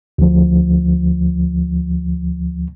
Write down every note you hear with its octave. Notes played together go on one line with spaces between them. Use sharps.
D2 F3